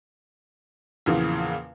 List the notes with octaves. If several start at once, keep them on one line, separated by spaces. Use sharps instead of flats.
E2 A#2 C#3 E3 F3